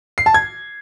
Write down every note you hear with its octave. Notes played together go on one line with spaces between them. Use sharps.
C7
A5
G#6